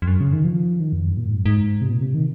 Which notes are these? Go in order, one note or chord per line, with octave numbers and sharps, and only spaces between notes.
F2
F#2
C#3
D#3
F3
D#3
F2
F#2
A#2
G#2
F#2
G#2
C3
A#2
C3
D#3